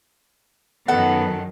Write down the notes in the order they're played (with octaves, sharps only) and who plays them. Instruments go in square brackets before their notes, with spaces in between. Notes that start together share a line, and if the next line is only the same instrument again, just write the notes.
[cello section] F#2 D#3 [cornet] B3 [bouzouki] A4 F#5